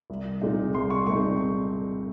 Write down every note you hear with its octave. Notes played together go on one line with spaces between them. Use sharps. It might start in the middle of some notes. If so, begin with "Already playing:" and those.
C2
A#2 G#3 C4 D#4
C2 C6
C#6
A#2 G#3 C4 D#4 C#6